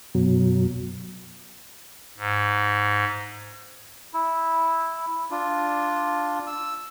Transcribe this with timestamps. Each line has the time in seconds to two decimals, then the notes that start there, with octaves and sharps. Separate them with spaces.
0.15 F#2 B2 F#3
2.17 G#2
4.14 E4
5.31 D4 F4
6.47 E6